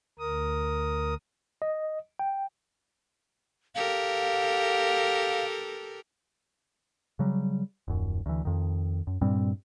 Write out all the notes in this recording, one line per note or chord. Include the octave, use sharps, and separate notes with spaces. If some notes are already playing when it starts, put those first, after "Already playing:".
D2 A#4 D#6
D#5
G5
G4 A4 A#4 F5
C#3 F#3 G3
D#1 F#2
D2 E3
F2 D#3
F#2
G2 A#2 G3 C4